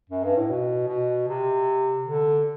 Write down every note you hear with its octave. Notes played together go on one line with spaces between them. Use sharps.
F#2
G2
A2
B2
B2
C3
D3